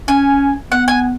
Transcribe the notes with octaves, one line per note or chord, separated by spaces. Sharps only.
C#4 G#5
B3 F#5
G#5